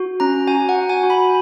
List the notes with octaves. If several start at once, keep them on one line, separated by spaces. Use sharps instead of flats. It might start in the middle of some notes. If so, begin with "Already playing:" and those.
Already playing: F#4
C#4 A#5
F#4 G#5
F#5
F#4
G#5
F#4
B5